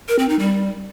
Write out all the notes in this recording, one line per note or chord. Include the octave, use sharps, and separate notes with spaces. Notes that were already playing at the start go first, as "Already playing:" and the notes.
A#4
C4
D#4
G3